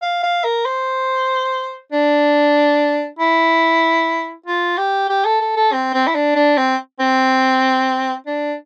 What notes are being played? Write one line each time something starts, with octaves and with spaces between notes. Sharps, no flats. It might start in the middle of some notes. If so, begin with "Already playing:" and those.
F5
F5
A#4
C5
D4
E4
F4
G4
G4
A4
A4
A4
C4
C4
E4
D4
D4
C4
C4
D4